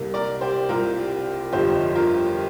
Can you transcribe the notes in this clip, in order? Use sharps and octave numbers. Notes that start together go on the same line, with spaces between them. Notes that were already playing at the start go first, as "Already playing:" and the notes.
Already playing: C2 C3 A#3
A#4 D5
G4 C5
C2 C3 A#3 F4 A#4
G1 F2 F3 G4 C5
F4 A#4